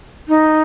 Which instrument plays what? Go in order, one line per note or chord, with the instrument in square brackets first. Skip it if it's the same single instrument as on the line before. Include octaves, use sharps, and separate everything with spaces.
[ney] D#4